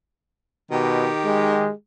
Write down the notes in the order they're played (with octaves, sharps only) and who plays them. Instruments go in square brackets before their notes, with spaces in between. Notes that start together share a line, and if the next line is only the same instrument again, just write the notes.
[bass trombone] B2 [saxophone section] D#3 G4
[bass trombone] G#3